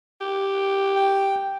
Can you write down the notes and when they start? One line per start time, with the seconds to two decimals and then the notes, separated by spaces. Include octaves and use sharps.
0.21 G4
0.96 G5